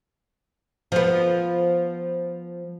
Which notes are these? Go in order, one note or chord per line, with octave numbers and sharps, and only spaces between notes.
F3 B3